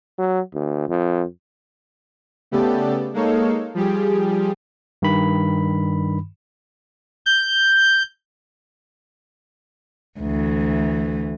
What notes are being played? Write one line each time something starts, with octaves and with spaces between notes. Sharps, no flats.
F#3
D2
F2
C#3 A3 B3 G4 A4 D5
G#3 A#3 D#4 A4 C#5 F5
F3 G3 G4 G#4
G2 D#3 B5
G6
D2 E3